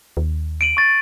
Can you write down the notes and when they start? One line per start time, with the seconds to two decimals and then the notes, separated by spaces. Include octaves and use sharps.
0.17 D#2
0.61 D7 D#7 F#7
0.77 C#6 A6